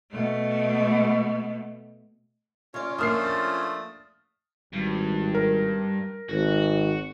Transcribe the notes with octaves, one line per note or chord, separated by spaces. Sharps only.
B2 A3
C#3 C#4 F4 C#5 D5
F3 A3 A#3 D4 D#6 F6 C7
A6
G#1 G2
A#4
G#1 F#4